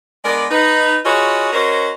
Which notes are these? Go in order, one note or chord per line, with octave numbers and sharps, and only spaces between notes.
G#3 B3 D4 A#4 D5
D#4 B4
F4 F#4 G#4 B4 C#5 D#5
C#4 F#4 A#4 C5 C#5 D#5